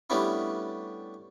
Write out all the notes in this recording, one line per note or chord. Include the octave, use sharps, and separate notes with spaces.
G3 A3 B3 C#4 D4 E4